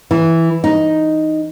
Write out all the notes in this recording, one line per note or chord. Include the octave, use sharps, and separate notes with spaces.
E3
D#4